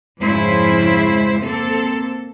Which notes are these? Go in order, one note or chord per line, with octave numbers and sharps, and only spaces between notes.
F2 G#2 C#3 G#3 E4 C5
A#3 C4 A4